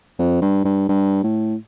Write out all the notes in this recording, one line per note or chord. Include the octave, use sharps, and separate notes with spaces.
F2
G2
G2
G2
A2